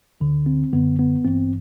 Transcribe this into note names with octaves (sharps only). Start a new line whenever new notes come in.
D2 D3
C4
G1 F#2 D3 B3
B3
A1 G2 E3 C4